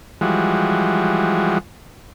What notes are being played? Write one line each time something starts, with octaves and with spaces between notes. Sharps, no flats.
E3 F3 G3 G#3 F#4